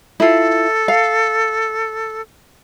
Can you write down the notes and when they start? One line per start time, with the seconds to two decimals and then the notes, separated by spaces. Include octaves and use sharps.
0.20 E4 F4 A4
0.88 F5